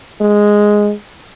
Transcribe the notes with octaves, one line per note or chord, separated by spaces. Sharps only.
G#3